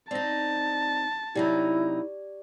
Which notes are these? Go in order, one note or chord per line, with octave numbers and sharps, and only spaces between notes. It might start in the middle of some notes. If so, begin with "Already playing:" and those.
C4 D#4 D5 A5 A#6
C3 F#3 D#4 E4 G4 D5